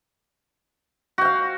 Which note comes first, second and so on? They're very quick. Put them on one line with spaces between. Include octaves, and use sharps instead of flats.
F#4 G5 F5